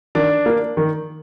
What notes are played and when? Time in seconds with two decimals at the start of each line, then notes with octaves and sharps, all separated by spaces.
0.15 D#3 D4
0.46 A#3 D4
0.77 D#3